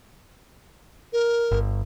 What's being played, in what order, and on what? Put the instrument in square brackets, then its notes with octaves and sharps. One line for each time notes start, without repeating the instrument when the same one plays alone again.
[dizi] A#4
[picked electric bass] G1